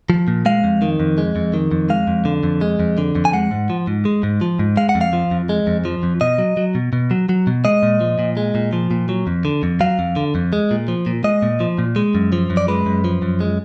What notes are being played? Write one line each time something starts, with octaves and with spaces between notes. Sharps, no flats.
F3
A#2
G#3 F5
F2
D#3
F2
G#3
F2
D#3
F2
G#3 F5
F2
D3
F2
G#3
F2
D3
F2
G#5
G#3 F#5
G#2
F3
G#2
G#3
G#2
F3
G#2
G#3 F5
F#5
F2
F5
F3
F2
G#3
F2
F3
F2
B2 D#5
F#3
F#3
B2
B2
F#3
F#3
B2
G#3 D#5
A#2
F3
A#2
G#3
A#2
F3
A#2
F#3
F2
D3
F2
F#3 F5
F2
D3
F2
G#3
A#2
F3
A#2
G#3 D#5
A#2
F3
A#2
G#3
F#2
F3
F#2
D5
G#3 B4
F#2
F3
F#2
G#3